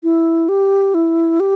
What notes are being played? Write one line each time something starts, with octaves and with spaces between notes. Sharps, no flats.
E4
G4
E4
G4